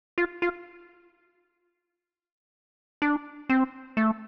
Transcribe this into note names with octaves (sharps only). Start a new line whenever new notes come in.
F4
F4
D4
C4
A3